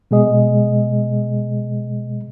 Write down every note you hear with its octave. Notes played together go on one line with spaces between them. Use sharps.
B2 G#3 G#4 D#5